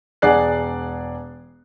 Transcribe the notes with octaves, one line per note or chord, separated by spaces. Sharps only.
E1 G#4 D5 F#5 F#6 C7